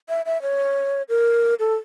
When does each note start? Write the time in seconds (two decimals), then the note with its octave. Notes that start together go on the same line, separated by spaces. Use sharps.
0.09 E5
0.26 E5
0.42 C#5
1.09 A#4
1.59 A4